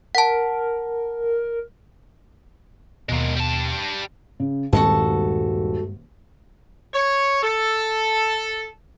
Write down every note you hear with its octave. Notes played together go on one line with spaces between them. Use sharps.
A#4 F#5 A5
D#2 B2 G#3 A#3
G3 A5
C#3
D#1 G2 G#3 C4 F#4 A4 A5
C#5
A4